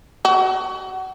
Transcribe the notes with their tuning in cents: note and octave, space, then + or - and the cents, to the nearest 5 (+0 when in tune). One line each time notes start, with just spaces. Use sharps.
F#4 +25